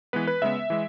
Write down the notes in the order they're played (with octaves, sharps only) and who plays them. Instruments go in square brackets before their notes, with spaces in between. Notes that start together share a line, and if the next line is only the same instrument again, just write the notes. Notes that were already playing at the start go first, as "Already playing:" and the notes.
[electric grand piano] E3 G#3 B3 B4
B4
C#3 G#3 B3 E5
E3 G#3